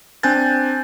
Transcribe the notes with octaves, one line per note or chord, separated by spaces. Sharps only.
C4 D4 G#5 F#6 G6 A6